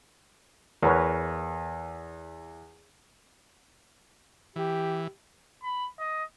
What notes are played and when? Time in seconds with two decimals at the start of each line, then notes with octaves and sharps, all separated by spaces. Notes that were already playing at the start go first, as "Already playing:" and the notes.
0.83 E2 A#4 B4 C#5
4.56 E3 G4
5.63 B5
5.99 D#5